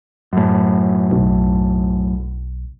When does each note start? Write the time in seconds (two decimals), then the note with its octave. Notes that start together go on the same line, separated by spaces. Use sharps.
0.33 F#2 A2
1.11 B1